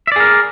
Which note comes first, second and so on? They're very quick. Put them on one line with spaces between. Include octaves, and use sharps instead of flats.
E5 D5 G#4 A#4